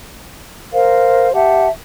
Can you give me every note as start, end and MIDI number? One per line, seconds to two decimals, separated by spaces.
0.72 1.31 70
0.72 1.31 72
0.72 1.31 77
1.33 1.68 67
1.33 1.68 76
1.33 1.68 78
1.33 1.68 81